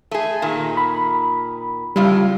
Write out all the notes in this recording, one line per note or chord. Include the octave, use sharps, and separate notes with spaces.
A3 G#4
A#2 D#3
B5
A2 C#3 G3 F4